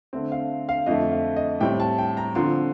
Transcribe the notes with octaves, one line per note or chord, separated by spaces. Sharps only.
D3 A3 C4
F5
F5
F2 D3 A3 D#5
F5
D#5
A2 G3 C4 G5
A5
G5
A#5
D3 F3 C4 C6